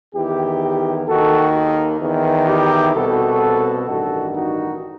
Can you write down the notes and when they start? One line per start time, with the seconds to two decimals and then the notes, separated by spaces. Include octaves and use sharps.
0.15 E2 D#3 E4 G4
1.08 D#2 D#3 F#4 A4
2.01 E2 D#3
2.47 E4 G4
2.95 C2 B2 F#4 A4
3.88 A1 G2 D#3 F#4 A4
4.34 D#4 F#4